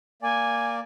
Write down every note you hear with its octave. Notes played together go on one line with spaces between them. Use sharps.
A#3 D5 G#5